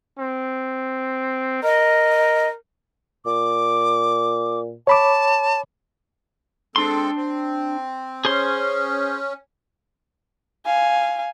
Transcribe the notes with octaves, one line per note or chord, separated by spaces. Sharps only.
C4
A#4 D#5
A#2 D6
C#5 A5 B5 D6
G#3 C4 D4 A4 C6
C4
C#4 G#4 C5 C6
F5 G#5